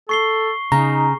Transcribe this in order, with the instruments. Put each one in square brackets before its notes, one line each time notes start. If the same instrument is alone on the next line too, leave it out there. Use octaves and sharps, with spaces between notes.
[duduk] A4 [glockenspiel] C#6 C7 G7
[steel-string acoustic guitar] C#3 [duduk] D#4 [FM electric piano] A#5